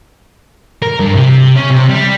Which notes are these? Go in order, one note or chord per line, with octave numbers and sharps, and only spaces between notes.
A#4
G2
C3
C#4
C3
G3